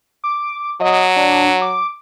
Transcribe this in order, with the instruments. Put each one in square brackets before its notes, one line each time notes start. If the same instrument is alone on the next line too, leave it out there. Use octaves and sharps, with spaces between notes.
[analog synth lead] D6
[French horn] F#3 [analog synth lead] D#5
[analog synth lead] D4
D6